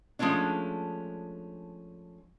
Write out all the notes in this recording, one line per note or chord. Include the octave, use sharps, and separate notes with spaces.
F3 G#3 A3 C#4 D4